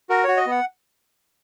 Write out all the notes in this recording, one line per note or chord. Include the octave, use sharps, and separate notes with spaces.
F#4 A#4
F#4 C#5
D#5
B3 F#5